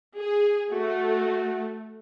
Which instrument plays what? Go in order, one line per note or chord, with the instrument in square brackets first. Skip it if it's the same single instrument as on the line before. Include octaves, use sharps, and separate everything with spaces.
[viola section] G#4
[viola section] A3 [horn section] F#4